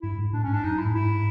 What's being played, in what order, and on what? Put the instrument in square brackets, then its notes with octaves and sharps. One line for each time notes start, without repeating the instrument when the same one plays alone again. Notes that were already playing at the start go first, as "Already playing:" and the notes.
[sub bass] G2 [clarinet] E4
[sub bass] G#2
[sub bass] A2 [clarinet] D4
[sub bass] G#2 [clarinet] C#4
[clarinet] D4
[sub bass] F#2 [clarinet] D#4
[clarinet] E4
[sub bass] A2
[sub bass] G#2 [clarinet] E4